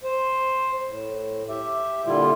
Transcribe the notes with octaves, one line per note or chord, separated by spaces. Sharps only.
C5
A2
G4 E5
A#2 D3 G3 E4 F4